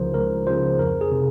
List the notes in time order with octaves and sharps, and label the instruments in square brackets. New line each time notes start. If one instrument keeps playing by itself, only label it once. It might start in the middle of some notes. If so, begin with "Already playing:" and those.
Already playing: [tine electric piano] C#2 C#3 F3 A#4 C5
C#2 A#4
C#3 F3 C5
F2 A#4
G#4
C3